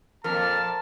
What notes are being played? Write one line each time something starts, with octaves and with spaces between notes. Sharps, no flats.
F2 A#2 A#4 A5 F6